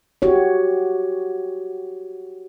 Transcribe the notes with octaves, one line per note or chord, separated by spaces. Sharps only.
F#4 G4 C#5